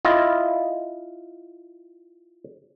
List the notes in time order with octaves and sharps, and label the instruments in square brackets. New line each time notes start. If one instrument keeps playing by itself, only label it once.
[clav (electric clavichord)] E4 F4 D#5